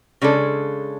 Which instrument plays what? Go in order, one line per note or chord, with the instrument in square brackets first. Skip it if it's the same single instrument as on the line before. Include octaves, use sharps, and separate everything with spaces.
[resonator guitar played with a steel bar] C#3 G#3 D4 A4